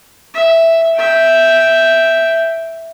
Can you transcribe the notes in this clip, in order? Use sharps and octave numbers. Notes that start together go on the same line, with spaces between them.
E5
E5 G5